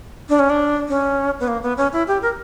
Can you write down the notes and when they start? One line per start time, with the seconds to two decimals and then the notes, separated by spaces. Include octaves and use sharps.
0.29 D4
0.39 C#4
0.50 D4
0.89 C#4
1.40 B3
1.48 A#3
1.63 B3
1.77 C#4
1.93 E4
2.07 G4
2.22 A#4